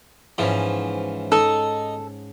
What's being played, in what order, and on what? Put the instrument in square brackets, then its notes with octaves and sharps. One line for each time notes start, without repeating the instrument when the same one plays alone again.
[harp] G#2 C#4 [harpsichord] E3 F3
[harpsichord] D#4 [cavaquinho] A4